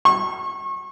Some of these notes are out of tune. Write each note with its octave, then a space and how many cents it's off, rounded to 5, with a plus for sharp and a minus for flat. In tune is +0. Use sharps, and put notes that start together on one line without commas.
C#6 -35